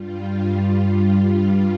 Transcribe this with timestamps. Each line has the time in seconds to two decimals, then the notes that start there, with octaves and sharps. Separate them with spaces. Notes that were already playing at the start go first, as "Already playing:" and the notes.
Already playing: G2 G3 F4
1.29 G2 G3 F4